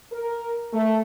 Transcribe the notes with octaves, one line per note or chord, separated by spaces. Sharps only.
A#4
A3